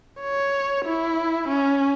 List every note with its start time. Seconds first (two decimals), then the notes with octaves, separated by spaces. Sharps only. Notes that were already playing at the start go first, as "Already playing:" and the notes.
0.21 C#5
0.85 E4
1.48 C#4